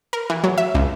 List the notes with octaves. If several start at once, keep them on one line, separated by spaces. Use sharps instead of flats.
A#4
E3
F#3
E5
C#2